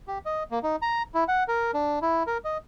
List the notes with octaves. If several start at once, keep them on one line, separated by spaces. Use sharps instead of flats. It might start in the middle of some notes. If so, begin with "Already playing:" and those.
G4
D#5
A#3
D#4
A#5
E4
F#5
A#4
D4
E4
A#4
D#5